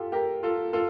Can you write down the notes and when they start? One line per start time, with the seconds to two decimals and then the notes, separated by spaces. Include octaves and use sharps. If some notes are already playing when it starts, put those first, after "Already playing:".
Already playing: F4 G4 A4
0.12 G4 A#4
0.43 F4 A4
0.73 F4 A4